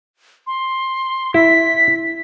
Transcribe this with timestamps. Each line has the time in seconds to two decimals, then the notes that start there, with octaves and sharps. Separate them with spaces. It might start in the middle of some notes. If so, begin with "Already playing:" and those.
0.47 C6
1.34 E4 B6